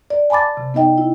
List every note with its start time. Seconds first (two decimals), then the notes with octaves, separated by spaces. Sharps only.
0.10 D5
0.30 G#5 A5 B5 D6 A6
0.57 C3
0.74 B3 D#4 D#5 G5
0.98 E4